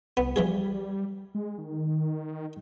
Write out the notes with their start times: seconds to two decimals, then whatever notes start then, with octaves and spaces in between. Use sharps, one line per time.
0.17 C2 B3
0.36 E3 F3 G3 G#4
1.35 G#3
1.58 D#3